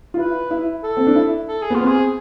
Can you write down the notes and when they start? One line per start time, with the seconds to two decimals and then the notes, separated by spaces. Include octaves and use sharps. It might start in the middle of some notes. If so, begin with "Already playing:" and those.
0.14 F4
0.18 E4 B4
0.51 E4
0.83 A4
0.97 C4
1.07 D4
1.15 E4
1.48 A4
1.62 G#4
1.70 B3 F4
1.80 C4
1.88 G#4